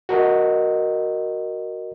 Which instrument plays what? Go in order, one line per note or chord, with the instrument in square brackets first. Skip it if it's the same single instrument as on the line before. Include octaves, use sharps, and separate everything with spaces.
[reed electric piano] F#4 A#4 D#5